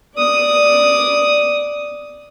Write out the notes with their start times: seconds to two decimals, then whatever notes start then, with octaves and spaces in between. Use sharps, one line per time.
0.16 D5 D#6